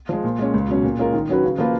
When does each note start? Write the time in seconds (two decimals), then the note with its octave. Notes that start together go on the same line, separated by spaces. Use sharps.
0.09 F3 G#3
0.24 A#2
0.39 G#3 C#4
0.54 C#2
0.68 B2 F#3 C#4
0.84 A#2
0.99 G#3 C#4 F4 A#4
1.13 D#3
1.29 F#3 C#4 F#4 B4
1.44 C#3
1.58 F3 A#3 F4 B4